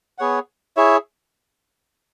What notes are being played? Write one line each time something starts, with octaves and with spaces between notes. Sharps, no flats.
B3 G#4 C#5 F#5
E4 G#4 C#5 E5